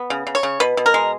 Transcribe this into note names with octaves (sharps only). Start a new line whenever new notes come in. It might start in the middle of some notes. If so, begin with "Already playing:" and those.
Already playing: B3
C#3
C#3
C#5
C#3
B2 B4
B2
A#4
G#3